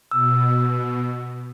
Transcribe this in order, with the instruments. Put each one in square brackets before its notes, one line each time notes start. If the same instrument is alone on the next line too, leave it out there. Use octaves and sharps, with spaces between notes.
[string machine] B2 [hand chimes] E6